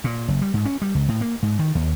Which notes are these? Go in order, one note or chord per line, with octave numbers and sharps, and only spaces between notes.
A#2
F#1
G3
G#2
C#4
G3
C#2
A2
A#3
G#2
D#3
D#2